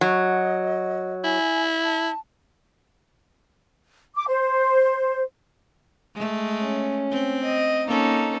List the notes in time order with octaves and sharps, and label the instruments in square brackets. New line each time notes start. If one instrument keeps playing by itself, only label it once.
[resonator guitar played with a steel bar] F#3 [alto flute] D#5
[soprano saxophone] E4 [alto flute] G#5
[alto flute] A5
[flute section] D6
C5
[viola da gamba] G#3 A3
[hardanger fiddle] C#4
[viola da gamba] C4
[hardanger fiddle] D#5
[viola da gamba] A#3 C#4 [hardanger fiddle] D#4 A4